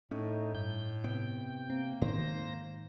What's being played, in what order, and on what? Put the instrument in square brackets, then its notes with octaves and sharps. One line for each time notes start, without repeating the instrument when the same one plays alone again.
[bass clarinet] A2 [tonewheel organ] A3 D#4 [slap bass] C#4
[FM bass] G2 [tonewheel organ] G6
[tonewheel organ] C3 G5 [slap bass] B3
[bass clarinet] A#3 [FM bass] C4
[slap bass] G#2 [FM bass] D#3 [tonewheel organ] C5 A#6